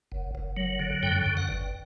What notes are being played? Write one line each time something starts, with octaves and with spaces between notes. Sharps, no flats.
F#1
F#1
F#3
D3
F#2 G5
F#2
F#5
G1